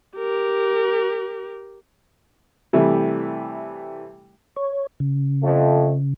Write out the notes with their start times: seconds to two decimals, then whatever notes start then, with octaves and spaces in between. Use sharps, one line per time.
0.17 G4 A#4
2.73 C3 E3 G3 A3
4.56 C#5
5.00 C#3
5.43 F2 A3